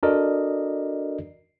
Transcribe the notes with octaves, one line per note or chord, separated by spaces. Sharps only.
D4 F#4 A4 A#4 D5 D#5